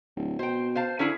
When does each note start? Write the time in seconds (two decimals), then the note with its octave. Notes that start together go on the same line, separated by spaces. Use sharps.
0.16 D1
0.39 B2 C5 G5
0.75 C5 F5 A5
0.99 D3 C#4 E4 G#4